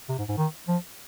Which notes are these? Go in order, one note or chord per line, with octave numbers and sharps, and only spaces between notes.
C3
G#2
G#2
D#3
F3